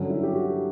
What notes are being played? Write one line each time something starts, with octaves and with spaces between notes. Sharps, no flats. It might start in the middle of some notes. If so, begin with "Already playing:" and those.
Already playing: G2 D3 F#3 C#4
E4
G4
F#4
G4